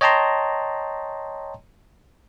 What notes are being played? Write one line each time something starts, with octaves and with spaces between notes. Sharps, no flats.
C#5 D#5 G5 A5 A#5 C6